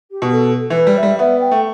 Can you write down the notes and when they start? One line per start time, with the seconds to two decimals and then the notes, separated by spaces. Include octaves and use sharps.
0.11 G4
0.22 B2
0.33 A4
0.70 E3
0.75 B4
0.87 G3
0.97 E5
1.03 G3
1.19 B3 E5
1.40 G5
1.51 A3